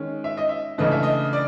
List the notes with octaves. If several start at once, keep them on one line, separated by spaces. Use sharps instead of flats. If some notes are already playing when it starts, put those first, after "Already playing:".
Already playing: D#3 G#3 C#4
E5
D#5
E5
C#3 E3 A3 D4 D#5
E5
D#5
D5